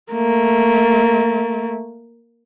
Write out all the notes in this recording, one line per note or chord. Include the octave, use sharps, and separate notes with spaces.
A3 A#3